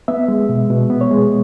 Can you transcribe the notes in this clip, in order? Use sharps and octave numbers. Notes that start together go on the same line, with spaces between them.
B3 E5
G#3
B2
B2
B3
C#5
G#3